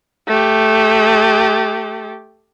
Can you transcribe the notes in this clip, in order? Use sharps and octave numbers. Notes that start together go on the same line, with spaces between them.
A3 G4